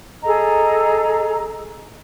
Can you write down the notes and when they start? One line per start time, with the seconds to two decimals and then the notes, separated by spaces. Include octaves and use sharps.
0.24 G#4 A4 D#5 A#5